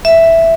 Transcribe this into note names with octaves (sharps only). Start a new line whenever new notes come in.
E5